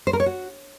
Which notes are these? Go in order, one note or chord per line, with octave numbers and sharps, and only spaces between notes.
C5
A#4
C#5
F#4